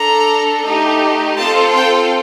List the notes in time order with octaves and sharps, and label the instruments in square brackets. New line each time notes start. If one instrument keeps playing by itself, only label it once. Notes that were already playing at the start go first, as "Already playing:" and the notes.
Already playing: [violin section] D4 A4 A#5
A3 D#4 G4
C4 F4 A4 A5
G5